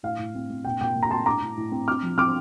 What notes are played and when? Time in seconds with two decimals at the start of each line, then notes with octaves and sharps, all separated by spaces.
0.03 A2 F5
0.18 A2
0.35 C4
0.50 C4
0.65 A#2 G5
0.81 A#2 G5
0.95 A#2
1.03 A#5
1.10 C4 A5 C6
1.26 A2 A#5 D6
1.42 A2
1.57 A2
1.72 C4
1.88 C4 D6 F6
2.03 F3
2.18 C4 D6 F6